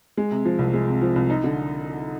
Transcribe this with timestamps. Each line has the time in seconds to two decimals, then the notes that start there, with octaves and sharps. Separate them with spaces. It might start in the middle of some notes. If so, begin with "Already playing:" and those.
0.17 G#3
0.32 C3
0.45 F3
0.59 C2
0.74 G#3
0.88 C3
1.02 F3
1.16 C2
1.30 D#4
1.44 D3